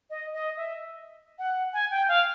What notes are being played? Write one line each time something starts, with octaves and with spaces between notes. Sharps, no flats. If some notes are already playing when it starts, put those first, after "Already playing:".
D#5
D#5
E5
F#5
G#5
G5
F5